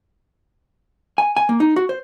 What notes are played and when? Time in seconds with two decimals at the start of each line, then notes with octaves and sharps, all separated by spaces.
1.18 G#5
1.37 G#5
1.49 A#3
1.60 D#4
1.76 F#4
1.89 C5